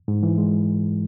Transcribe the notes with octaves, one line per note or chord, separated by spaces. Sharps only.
G#2
E3
G#3